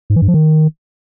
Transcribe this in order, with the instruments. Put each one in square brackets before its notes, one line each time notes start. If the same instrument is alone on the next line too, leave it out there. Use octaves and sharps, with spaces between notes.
[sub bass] G#2
E3
G2
F3
D#3